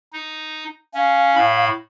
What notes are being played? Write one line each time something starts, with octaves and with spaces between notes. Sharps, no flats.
D#4
C#4 F5
A2 B5